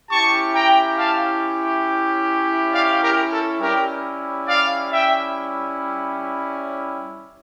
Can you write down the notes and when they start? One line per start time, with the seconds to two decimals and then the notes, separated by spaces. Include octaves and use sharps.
0.11 C#4 E4 G4 A5 C#6
0.55 G5 A#5
0.98 F5 A5
2.73 D5 F5
3.03 G4 A#4
3.31 A4
3.60 G3 C#4 E4 G4 A#4
4.48 D5 F5
4.92 E5 G5